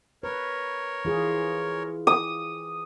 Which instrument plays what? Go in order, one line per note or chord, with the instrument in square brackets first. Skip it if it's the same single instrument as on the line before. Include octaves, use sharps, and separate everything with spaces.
[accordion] A#4 C#5 [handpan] B4
[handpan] E3 F4 G#4
[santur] D#6